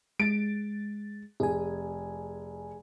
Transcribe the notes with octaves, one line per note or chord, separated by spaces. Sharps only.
G#3 A6 D7
F1 G#4 G#5